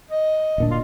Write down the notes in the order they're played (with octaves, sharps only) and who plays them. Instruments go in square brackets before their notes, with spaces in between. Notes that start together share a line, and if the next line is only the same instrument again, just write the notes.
[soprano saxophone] D#5
[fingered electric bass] D1 A#2 D4
[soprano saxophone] F4